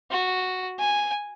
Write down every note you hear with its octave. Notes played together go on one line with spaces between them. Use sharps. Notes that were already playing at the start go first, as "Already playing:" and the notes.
F#4
G#5